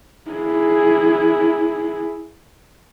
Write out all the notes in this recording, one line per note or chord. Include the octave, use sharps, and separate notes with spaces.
E4 G#4